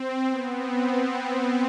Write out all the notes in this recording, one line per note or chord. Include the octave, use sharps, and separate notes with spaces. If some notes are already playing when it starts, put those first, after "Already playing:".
Already playing: C4
B3
C4